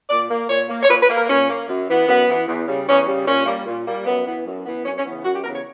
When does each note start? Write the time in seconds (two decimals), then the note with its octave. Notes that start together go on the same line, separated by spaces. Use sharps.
0.10 A#2 D5
0.30 A#3
0.49 A#2 C#5
0.69 A#3
0.83 C#5
0.89 A#2 B4
1.03 B4
1.09 A#3
1.15 A#4
1.29 A#2 C#4
1.49 A#3
1.68 F#2
1.88 E3 B3
2.07 F#2 B3
2.27 E3 B3
2.47 E2
2.67 C#3 G3
2.87 E2 C#4
3.07 C#3 G3
3.26 A#2 C#4
3.46 G3 A#3
3.66 A#2
3.87 G3 A#3
4.05 F#2 B3
4.25 E3 B3
4.46 F#2
4.65 E3 B3
4.85 F#2 C#4
4.98 C#4
5.05 C#3 E3 B3
5.25 F#2 F#4
5.34 G4
5.44 C#3 E3 B3 A#4
5.55 C#5